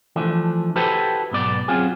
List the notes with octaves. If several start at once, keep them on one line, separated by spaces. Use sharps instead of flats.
E3 F3 A3 D4
E4 F#4 G4 A4 B4 C5
B1 G#2 B3 D5
F#3 C4 C#4 F4 F#4 G#4